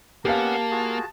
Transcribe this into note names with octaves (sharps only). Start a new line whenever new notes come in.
A#3 B3 C#4 G4 F5 F#5 A5
F4 F#4 G#4